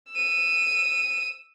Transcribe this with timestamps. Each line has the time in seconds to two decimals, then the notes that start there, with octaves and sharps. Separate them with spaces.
0.12 E6 D#7